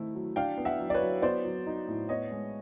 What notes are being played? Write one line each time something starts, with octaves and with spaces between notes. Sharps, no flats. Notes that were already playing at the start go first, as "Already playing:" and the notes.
Already playing: D#3 A3 C4 E4
F#3
D4 F5 G5
B3
E5 F#5
F#3
D5
B4 C#5
F#3
B3 C5 D5
F#3
D#4
A2
B3 C#5 D#5
G#3